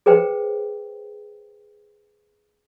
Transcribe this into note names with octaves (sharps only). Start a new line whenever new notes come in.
G#4 B4 C5 G5